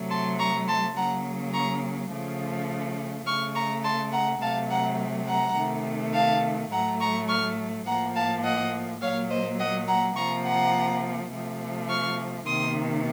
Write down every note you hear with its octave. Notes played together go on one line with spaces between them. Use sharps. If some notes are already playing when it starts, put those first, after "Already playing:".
Already playing: C3 F#3 A3
A5 C6
A#5 C#6
A5 C6
C#3 F#3 A#3 F#5 A#5
A#5 C#6
C#3 F3 A3
C#3 A3 C#6 F6
A#5 C#6
A5 C6
F#5 A#5
C3 F#3 A3 F5 A5
F#5 A#5
F#5 A#5
C3 D#3 A3
F5 A5
A2 F#3 A3 F#5 A#5
A#5 C#6
C#6 F6
A2 F3 A#3 F#5 A#5
F5 A5
D#5 F#5
A#2 F#3 A#3 C#5 F5
C5 D#5
D#5 F#5
F#5 A#5
C3 F3 A#3 A#5 C#6
F#5 A#5
C3 F3 A3
C#6 F6
C3 D#3 A#3 C6 D#6